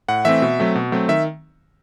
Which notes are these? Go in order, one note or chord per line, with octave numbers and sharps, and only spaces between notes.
A2 F#5
E3 A3 C4 E5
B2
F#3 A3 C4
B2
F#3 A3 C4
D#3 E5